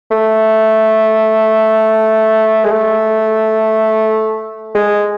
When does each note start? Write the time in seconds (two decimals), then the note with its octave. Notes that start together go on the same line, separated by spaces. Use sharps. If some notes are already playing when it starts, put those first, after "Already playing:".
0.11 A3
2.64 G#3
2.71 A3
4.75 G#3